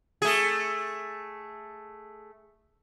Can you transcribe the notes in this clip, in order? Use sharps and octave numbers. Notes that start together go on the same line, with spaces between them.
A3 G#4